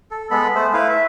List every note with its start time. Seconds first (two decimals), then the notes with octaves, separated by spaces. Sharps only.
0.11 A4
0.31 G#3 B3 A4 B5
0.55 A3 C5
0.73 A3 E4 B4 F5
0.89 E5